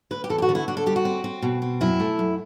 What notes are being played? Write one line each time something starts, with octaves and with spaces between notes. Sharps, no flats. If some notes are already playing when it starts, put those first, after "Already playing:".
D2 B4
G4
E2 A4
G4
F#4
D3
E4
D3 F#4
A4
G3 G4
F#4
C4
C4
B2
C4
F#2 E4
A3
F#2